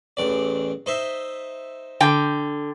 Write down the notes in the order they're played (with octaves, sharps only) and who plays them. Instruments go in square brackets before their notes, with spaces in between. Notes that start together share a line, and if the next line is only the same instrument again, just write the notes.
[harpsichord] A1 E2 D5
D#4 C5 E5
[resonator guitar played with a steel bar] D3 G5